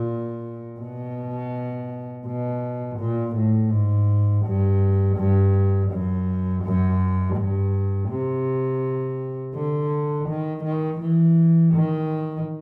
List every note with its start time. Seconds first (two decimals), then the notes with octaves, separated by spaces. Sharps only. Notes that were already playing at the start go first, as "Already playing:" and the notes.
Already playing: A#2
0.81 B2
2.26 B2
2.99 A#2
3.36 A2
3.71 G#2
4.45 G2
5.17 G2
5.91 F#2
6.64 F#2
7.36 G2
8.09 C3
9.55 D3
10.29 D#3
10.64 D#3
11.01 E3
11.74 D#3